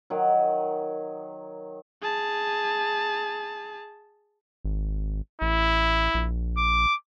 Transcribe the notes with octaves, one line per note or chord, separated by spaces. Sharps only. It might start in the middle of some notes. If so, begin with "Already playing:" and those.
D#3 F#3
G#4 A5
G#1
A1 E4
A#1
D6